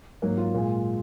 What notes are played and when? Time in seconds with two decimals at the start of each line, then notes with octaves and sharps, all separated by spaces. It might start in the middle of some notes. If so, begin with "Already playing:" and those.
0.22 G#2 F#3 A#3
0.37 F4
0.54 A#2 G#3 F4